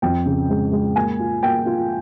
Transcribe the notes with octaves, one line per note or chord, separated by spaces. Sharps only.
F2 G5
C#3
G#3
G#3
A#3 G#5
F4
A#3 G5
F4